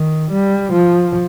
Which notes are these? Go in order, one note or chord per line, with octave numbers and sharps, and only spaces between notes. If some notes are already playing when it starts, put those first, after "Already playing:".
Already playing: D#3
G3
F3